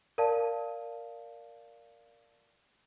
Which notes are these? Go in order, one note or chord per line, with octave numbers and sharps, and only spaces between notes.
A#4 D5 F5 A5